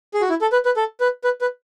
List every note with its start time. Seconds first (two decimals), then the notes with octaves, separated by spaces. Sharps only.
0.14 G#4
0.21 F#4
0.30 E4
0.41 A4
0.52 B4
0.65 B4
0.77 A4
1.00 B4
1.24 B4
1.41 B4